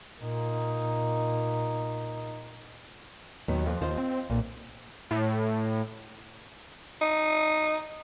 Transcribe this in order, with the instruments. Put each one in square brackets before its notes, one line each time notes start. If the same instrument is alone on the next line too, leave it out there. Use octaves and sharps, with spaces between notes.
[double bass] A#2 D#4
[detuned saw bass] D#2 [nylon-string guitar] D#3 F#3 B3
[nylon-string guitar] F2
[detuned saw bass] D#2 [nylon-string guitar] F4 C5 D#5
[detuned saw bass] C4
[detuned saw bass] B1 [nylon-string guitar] A#2
[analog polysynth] A2
[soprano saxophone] D#4